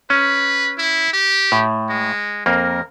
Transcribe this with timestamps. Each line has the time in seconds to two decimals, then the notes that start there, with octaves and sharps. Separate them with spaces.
0.10 C#4 B4
0.78 E4
1.13 G4
1.52 A2
1.90 G#3
2.46 F2 A#3 A#4